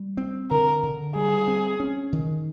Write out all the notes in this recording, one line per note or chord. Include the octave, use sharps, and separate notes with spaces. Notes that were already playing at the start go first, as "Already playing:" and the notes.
Already playing: G3
C4
D3 A#4
D3
G3 G#4
C4
C#4
D#3